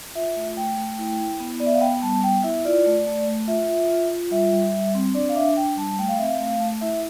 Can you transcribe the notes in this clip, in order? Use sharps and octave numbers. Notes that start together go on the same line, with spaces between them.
F4 E5
A3
A3 G5
A3
E4
E4
B3
B3 D5
E5
F5
B3 G5
G3 A5
B3 G5
E4 E5
F4 D5
A3
A3
A3
F4 E5
F4
F4
F4
G3 E5
G3
G3
C4
D4 D5
F5
D4 E5
D4 G5
G3 A5
A3 G5
F5
C4 E5
F5
A3
A3
E4 E5